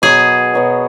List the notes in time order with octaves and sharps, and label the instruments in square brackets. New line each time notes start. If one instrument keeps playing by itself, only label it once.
[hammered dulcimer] B2 F#3 B3 [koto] G#4
[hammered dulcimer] B2 F#3 B3